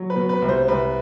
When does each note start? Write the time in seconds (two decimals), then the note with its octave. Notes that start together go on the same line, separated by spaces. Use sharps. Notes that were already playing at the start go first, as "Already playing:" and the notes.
Already playing: F#3
0.10 B4
0.16 B2
0.29 B4
0.42 C2
0.49 C5
0.68 C2 B4